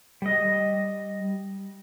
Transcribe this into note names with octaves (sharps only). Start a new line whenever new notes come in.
G3 D#5